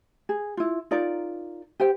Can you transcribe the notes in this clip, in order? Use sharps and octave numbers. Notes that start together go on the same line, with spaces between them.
G#4
E4 F4
D#4 F4 A#4 D5
G4 C5 G5